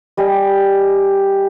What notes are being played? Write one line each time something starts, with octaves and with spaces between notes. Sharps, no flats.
G3 D#5 G#5